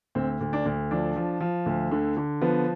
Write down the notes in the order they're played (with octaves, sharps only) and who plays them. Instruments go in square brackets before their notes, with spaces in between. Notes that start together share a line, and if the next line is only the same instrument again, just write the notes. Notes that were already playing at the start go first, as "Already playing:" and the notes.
[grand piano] D2 C4
D2
D4
D2
F3 D4
F3
F3
D2
D3
D3
F3 B3